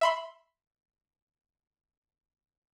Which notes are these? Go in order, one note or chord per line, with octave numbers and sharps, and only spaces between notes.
E5 B5 C6